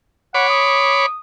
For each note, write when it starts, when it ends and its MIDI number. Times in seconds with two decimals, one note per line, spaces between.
0.34 1.06 73
0.34 0.46 78
0.34 1.06 83
0.34 1.06 86
0.49 1.19 87